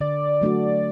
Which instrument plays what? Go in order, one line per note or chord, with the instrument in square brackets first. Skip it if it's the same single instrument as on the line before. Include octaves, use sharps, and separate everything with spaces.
[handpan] D3 [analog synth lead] D5
[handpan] F#3 A3 D4 F#4